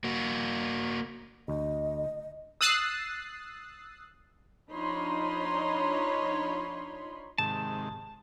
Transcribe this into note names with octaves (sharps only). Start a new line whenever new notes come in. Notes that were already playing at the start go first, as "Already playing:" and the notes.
A#3 F#4
D2 D#5
D#6 E6 F#6 A6 C7
F3 D4 D#4 C#5 B5 C6
G#2 C3 D#3 A5